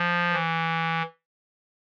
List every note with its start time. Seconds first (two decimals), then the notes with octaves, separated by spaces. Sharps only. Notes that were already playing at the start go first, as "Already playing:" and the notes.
Already playing: F3
0.33 E3